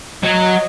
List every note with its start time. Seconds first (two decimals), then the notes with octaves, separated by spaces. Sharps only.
0.23 F#3 D#5